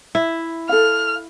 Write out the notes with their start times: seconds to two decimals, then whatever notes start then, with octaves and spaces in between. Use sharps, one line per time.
0.15 E4
0.69 A4 F5 F6